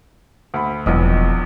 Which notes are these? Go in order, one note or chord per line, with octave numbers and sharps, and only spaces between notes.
D2 B5
E1 A#1 E2 F#3 D#5